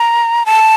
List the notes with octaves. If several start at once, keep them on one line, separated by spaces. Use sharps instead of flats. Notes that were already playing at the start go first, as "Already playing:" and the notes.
Already playing: A#5
A5